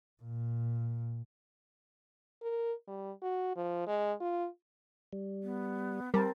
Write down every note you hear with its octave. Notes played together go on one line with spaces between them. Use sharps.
A#2
A#4
G3
F#4
F3
G#3
F4
G3
B3
G3 C4 A#4 A5